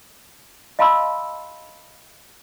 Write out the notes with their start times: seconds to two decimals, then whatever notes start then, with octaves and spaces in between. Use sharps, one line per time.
0.79 D#5 F5 A5 B5 C6 E6